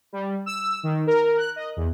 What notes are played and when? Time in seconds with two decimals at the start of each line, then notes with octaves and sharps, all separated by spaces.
0.13 G3
0.46 E6
0.83 D#3
1.07 A#4
1.37 F#6
1.56 D#5
1.76 E2